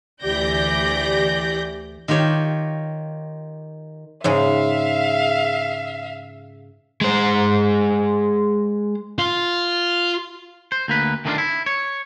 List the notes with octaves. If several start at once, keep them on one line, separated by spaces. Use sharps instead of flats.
D2 E3 G4 D5 G6 A#6
D#3 F4 G4 C#5
G#2 C#3 G#3 E5 F5
G#3 C5
F4
C5
D2 A#3 B4
D#3 A3 B3 C#4 D4 F4
E4
C#5